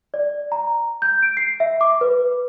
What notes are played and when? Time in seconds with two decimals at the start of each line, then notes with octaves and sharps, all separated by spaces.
0.14 D5
0.52 A#5
1.02 G6
1.22 D7
1.37 C7
1.60 E5
1.81 D6
2.01 B4